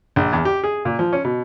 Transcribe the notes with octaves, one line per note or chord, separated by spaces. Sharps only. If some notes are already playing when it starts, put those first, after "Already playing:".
A#1
E2
G4
G#4
A#2
F3
C#4
B2